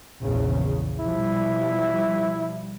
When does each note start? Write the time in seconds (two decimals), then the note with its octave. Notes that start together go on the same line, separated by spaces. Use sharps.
0.20 A#1 E2 C#3
1.00 B2 F3 G3 E4